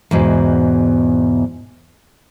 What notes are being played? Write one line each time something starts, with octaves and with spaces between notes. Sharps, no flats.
E2 G#2 B2